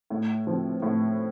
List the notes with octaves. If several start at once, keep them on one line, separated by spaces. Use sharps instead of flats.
A2
F3 C4
A2